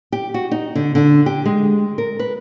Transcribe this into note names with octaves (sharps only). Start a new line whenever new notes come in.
G4
F#4
D#4
D3
D3
G4
G#3
A#4
B4